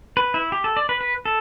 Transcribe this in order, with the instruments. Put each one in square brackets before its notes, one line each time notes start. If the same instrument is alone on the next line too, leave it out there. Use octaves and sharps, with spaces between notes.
[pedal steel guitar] B4
E4
G4
A4
D5
B4
B4
A4